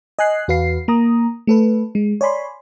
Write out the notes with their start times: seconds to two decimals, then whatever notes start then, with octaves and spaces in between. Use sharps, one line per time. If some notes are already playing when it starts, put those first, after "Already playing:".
0.19 D#5 G#5 F#6 C7
0.48 E2 F#4 B4 F5 C7
0.88 A#3 A#5 D#6
1.47 A3 A4 B4
1.95 G#3
2.21 C#5 D5 G#5 B5 C6